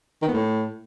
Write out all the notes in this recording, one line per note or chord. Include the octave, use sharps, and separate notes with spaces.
D#3
B3
A2